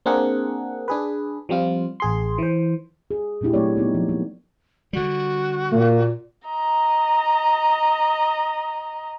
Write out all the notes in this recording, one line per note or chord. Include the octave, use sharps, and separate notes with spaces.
A#3 C4 D4 G#4 A#4 F#5
D4 G#4 B4
F3 G3 C4 F4
A1 G#4 C6
E3 C5
G#4
A#2 A3 D4 E4 G4
F#3 A3 C4 G4 C#5 D5
G3 B3 D#4
F3
A#3
D3 G3 F#4
A#2 A#3
D#5 A#5